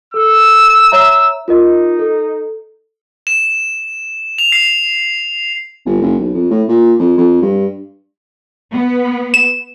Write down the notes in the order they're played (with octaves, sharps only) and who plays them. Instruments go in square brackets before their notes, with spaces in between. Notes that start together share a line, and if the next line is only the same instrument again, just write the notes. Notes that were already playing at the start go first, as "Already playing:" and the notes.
[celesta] A4 F6 [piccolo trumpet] E6
[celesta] C#5 E5 A#5
[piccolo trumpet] D#4 [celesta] F4 A#4 D#5
[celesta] A4
[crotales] E7
F7
C7
[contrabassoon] G1
F#1
B1
F2
A2
A#2
F2
F2
G2
[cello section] B3
[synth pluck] E7